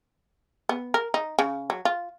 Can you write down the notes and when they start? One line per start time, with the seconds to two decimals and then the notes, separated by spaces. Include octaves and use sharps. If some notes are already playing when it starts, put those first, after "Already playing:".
0.69 B3
0.94 A#4
1.14 D#4
1.39 C#3
1.70 F#3
1.85 F4